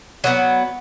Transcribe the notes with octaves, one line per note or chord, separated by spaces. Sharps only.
F#3 A#3 B3